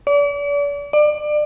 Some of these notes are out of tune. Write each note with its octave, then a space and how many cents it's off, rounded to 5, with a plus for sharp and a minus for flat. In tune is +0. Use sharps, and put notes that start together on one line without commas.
D5 -40
D5 +25